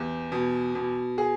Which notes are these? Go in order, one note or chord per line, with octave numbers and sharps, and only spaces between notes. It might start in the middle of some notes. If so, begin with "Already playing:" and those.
Already playing: E2 G4
B2
B2
G#4